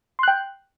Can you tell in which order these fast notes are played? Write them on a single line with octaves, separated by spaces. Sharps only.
C6 F#6 G5